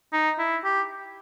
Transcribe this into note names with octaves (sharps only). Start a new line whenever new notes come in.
D#4
E4
G4